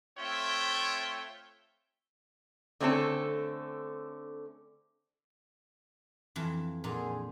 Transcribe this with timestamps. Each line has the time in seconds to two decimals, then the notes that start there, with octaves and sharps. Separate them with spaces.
0.19 A3 C4 F4 C#5 E5 G5
2.80 D3 A3 C4 C#4 E4 A4
6.36 F2 E3
6.84 A#2 D3 D#4 G#4 A#4